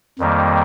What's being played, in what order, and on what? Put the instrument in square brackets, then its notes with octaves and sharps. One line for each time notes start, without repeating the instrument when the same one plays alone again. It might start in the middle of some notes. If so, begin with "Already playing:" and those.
[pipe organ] F2 D#3 G3 A#3